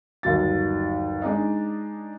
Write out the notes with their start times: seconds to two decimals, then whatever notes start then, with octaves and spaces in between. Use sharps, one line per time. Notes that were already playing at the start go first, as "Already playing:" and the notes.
0.23 G1 D#2 F#3 A6
1.22 G#3 D4 D#4 D#5